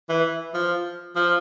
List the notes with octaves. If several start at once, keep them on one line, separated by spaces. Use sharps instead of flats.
E3
F3
F3